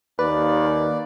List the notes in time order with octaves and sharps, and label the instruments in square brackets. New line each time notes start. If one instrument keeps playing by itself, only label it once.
[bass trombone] D#2 [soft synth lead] B4 [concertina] D5